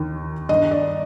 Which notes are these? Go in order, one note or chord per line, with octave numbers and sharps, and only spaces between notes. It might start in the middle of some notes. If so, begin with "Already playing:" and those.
Already playing: D#2 D#3
G2 D#3 D#5
D5